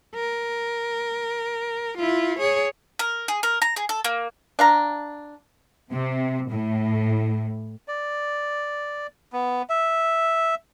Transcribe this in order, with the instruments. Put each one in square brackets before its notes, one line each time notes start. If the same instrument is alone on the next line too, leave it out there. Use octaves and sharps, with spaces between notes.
[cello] A#4
E4 F4
G#4 C#5
[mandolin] A#4
G#4
A#4
A#5
G#4
A4
A#3
[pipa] D4 F5 A#5
[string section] C3
A2
[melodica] D5
B3
E5